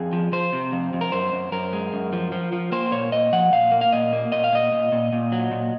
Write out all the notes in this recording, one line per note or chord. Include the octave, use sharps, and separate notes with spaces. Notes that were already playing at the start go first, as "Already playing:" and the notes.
Already playing: F2 G#4
F3
F3 C5
C3
F2
F2
A#4
F#2 C5
F#2
F#2 A#4
G#3
F#2
F3
F3
F3
A#3 C5
A#2 C#5
A#2 D#5
F3 F#5
A#2 F5
A#3
F5
A#2 D#5
A#3
A#2 D#5
F5
A#2 D#5
A#2
A#2
A#2
F#3
A#2